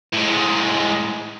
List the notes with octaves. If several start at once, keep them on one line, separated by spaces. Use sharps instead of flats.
A2 G#3